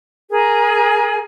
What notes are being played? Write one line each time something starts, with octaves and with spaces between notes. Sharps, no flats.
G#4 A#4 G#5